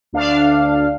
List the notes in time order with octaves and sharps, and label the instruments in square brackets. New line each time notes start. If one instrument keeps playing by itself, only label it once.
[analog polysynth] D2 D4 F5